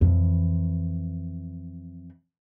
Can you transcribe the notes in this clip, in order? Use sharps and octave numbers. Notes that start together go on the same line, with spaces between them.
F2 E3